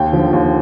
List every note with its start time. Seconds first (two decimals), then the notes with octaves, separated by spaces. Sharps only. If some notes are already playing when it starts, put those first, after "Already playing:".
Already playing: D#2 G5
0.12 D3 F3
0.33 D#2